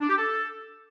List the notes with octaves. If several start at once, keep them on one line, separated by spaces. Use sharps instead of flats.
D4
G4
A4